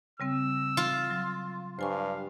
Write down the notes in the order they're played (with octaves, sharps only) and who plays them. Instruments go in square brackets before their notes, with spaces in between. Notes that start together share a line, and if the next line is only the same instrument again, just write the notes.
[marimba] C#3 G3 C4 [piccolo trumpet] E6
[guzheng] F4
[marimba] F#3
[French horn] G2 [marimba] C5 G#5 C#6 [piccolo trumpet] F5